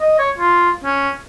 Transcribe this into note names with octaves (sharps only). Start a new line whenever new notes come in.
D#5
C#5
F4
C#4